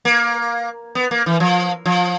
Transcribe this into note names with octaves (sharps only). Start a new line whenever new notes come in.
A#3
B3
A#3
E3
F3
F3